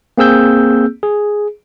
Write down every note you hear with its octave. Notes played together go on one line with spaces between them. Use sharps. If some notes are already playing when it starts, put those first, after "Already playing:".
A#3 C4 G#4 E6 G6
G#4